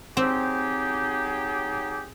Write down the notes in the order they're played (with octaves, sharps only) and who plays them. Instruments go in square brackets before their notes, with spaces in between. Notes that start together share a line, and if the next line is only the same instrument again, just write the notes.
[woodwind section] F#3 D#4 G4 [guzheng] C4 [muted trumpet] G#4